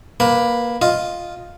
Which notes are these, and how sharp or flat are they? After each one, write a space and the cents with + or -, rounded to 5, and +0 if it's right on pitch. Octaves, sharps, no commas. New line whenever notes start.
A#3 +15 B4 +0 A#5 +0
F4 +0 D#5 +0